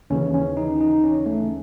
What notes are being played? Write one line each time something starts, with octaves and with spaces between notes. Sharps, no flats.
D#2 C#3 E3 C#4
C#4
D#4
D#4
C#4
A3